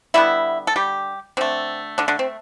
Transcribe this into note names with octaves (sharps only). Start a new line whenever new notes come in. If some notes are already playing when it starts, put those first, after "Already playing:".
D3 G3 B3 E4 E5
A4
G3 G4
D3 A3 C4
D3 D4
D3 D4
C4